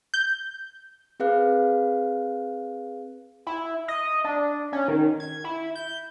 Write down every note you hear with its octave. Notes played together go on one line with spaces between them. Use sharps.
G6
C4 G#4 B4 F5 F#6
E4
D#5
D4
C#4
D#3
G#6
E4
G6